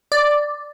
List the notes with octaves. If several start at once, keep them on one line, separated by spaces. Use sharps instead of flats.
D5